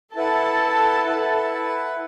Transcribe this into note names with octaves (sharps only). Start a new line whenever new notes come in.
E4 A4 B4 F#5 A5
E4 B4 F#5